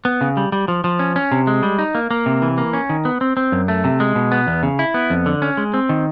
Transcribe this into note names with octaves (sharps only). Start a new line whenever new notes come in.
B3
C#3
G3
G3
F3
F3
C#4
C#4
C3
G#3
G3
D#4
A#3
A#3
C3
E3
A#3
C#4
D#3
B3
C4
C4
F#2
A3
C3
G#3
B2
B3
E2
C#3
E4
B3
F2
D3
C#4
G#3
C4
D#3